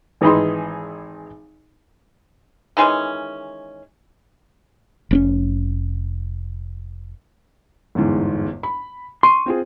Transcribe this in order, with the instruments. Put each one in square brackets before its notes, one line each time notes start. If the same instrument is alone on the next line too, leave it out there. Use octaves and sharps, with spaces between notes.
[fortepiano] G#1 E3 D#4 G#4 B5 C6
[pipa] D#3 E3 G#3 C#4
[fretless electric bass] F1 C4 C#4
[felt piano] G1 E2 G#2
B5
[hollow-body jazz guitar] C6 [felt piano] C#6 D#7
[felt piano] C4 F4 G#4